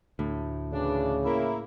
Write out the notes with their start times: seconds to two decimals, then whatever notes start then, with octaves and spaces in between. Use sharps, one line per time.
0.19 D2 A2
0.73 C#3 E3 D4
1.25 A#3 E4